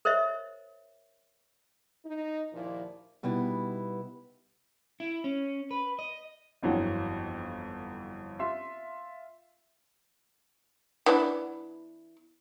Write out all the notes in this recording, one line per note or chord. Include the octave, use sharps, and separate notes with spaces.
A#4 C5 C#5 D#5 E5
D#4
D#2 A#2 F3 E4 D5
B2 G3 B3 D#4 E4 B4
E4
C#4
B4
D#5
G1 F2 E3 F#3 F#5
F4 E5 C6
E3 B3 D4